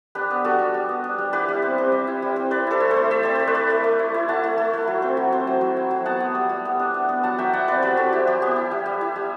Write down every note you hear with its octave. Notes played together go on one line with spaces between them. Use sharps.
D4 G4 B4
B3
G3 F#4 A4
G3
G3
B3
D4
G3
E4 G4 B4
G3
C4
C4
G3
E4
G3
C4
C4 B4 D5
E4 A4 C5
A3
A4 C5
A3
A3 E5
C4 D5
A3 C5
B4 D5
A3
A3
A3
E4
E4
E4 F#5 A5
A3
A3
A3
F#3
C4
F#3
C4
F#3
F#3
E4
F#3
B3 F#5 A5
B3
G3
G3
B3
D4
B3
B3
F#3 F#5 A5
F#3 E5 G5
E4 D5 F#5
C4 B4 D5
F#3 G4 B4
C4 F#4 A4
E4 G4
F#3 G4
B3 G4
E4
G3
G3
E4
G3